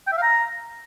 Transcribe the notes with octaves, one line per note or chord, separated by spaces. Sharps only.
G5
E5
F5
A#5